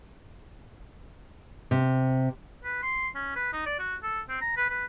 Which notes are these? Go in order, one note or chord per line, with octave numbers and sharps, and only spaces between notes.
C3
B4
C6
C#4
B4
D#4
D5
F#4
A4
C4
A#5
B4
B4